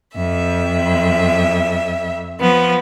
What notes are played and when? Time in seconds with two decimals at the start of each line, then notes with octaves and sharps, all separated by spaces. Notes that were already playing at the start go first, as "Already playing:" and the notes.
0.16 F2 E5
2.40 F3 B3